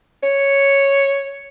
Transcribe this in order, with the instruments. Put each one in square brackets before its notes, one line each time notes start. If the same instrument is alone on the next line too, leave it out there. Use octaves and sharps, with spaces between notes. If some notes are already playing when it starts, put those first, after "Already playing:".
[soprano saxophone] C#5